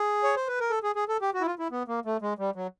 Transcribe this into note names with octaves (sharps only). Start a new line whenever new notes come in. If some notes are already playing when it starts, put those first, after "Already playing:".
Already playing: G#4
C#5
C5
B4
A#4
A4
G#4
G#4
A4
G4
F#4
E4
F4
E4
B3
A#3
A3
G#3
G3
F#3